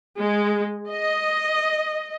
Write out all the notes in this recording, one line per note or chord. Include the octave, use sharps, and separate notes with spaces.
G#3
D#5